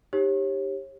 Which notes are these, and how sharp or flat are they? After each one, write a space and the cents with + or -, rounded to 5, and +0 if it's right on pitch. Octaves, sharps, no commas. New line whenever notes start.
D#4 +0 G4 +10 C#5 -35